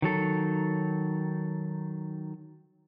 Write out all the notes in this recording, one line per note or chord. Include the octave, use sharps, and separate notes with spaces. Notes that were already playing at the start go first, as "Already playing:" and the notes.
D#3 F#3 A4